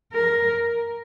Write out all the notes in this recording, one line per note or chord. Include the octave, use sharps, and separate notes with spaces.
A#4